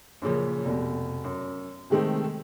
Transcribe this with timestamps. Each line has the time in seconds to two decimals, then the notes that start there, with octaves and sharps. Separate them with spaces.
0.22 F#2 A#2 C#3 F3
0.65 F1 B2
1.24 F#2
1.90 C3 D#3 G#3 A3 C4